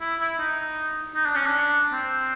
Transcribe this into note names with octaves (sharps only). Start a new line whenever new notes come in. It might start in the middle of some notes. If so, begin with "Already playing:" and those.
E4
E4
D#4
D#4
D4
C#4
D4
C4